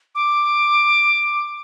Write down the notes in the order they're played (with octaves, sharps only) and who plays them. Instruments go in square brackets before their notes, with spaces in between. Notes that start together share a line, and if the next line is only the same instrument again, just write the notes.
[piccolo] D6